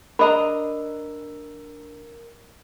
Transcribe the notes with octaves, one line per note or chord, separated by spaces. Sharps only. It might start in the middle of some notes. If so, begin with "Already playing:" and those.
D4 A#4 D#5 A#5 B5